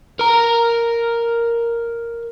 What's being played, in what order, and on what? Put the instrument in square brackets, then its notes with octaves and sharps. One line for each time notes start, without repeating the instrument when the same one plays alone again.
[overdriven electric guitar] A#4 A#5